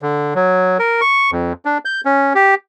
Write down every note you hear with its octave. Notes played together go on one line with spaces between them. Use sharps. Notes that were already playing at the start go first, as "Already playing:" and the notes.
D3
F#3
A#4
C#6
F2
D4
G6
C#4
G4